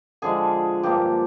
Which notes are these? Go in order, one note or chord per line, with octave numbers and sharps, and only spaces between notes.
D3 F3 G#3 G#4
G2 F3 A#3 G4